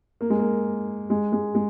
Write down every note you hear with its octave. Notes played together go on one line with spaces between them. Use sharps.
A#3
G#3
A#3
G#3
G#3
G#3